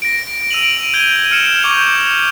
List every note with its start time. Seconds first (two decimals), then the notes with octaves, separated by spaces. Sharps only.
0.02 A#6 D7
0.51 E6 D7 D#7 F7 F#7
0.94 G6 G#6 D#7 G7
1.31 F6 C#7 E7
1.62 C#6 D6 G6 C#7 F7